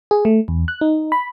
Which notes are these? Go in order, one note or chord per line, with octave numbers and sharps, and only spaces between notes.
G#4
A3
E2
F#6
D#4
B5